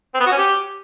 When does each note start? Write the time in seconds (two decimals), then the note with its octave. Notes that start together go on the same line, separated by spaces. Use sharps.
0.14 C4
0.20 B3
0.26 F#4
0.32 C#4
0.38 G4